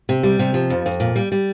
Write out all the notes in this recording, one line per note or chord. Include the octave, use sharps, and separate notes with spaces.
C3
G3
C3
F3
F2
F2
A#2
G3
G3